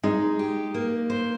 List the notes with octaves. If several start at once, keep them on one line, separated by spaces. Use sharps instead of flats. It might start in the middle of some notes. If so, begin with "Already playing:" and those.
G#3 D#4
G4
A#3
C5